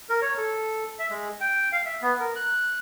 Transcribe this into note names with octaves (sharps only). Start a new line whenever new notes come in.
A#4
C#5
A4
E5
G#3
G5
F5
E5
B3
A#4
F#6